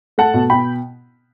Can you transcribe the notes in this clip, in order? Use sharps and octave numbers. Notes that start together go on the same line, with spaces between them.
A3 F#5 A5
B2
B2 G5 B5